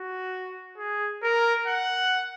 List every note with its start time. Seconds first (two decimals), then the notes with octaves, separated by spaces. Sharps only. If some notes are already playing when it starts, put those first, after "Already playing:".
Already playing: F#4
0.78 G#4
1.23 A#4
1.68 F#5